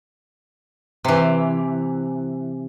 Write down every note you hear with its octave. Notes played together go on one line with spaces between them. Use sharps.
C3 E3